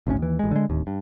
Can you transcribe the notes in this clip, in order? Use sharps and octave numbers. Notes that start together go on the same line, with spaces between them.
G#1 D2 A2 C#4
D#2 E3
A1 G#3
D3 G#3
D1 D#2
G2